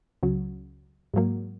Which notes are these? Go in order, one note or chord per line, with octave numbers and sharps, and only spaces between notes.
C#2 C#3 F#3
G#2 F#3 A#3